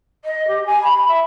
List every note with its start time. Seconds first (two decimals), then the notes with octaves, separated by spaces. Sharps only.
0.24 D#5
0.47 G4
0.66 G#5
0.83 B5
1.08 E5